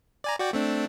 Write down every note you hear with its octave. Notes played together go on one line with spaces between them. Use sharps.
D5 G#5 A#5
F#4 D5 G5
A3 C4 D4